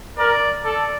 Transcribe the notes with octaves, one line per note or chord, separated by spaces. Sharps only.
A#4 D5
A4 D5